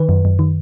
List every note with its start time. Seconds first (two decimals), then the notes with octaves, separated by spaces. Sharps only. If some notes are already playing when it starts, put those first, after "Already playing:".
Already playing: D#3 B4
0.09 F#2
0.25 F#2
0.39 D#3